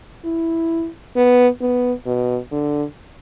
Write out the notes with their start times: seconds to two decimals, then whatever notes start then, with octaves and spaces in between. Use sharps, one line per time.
0.25 E4
1.16 B3
1.61 B3
2.07 B2
2.52 D3